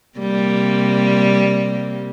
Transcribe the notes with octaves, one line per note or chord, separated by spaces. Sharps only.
C3 G3 A#3